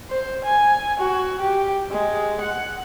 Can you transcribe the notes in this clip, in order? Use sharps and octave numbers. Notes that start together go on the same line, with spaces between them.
C5
G#5
F#4
G4
G#3
F#5